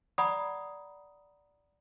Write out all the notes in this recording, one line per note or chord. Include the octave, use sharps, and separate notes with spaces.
D5 F#5 A#5 B5 D#6